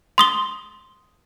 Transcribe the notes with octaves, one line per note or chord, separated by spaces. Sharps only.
C6 D#6 G7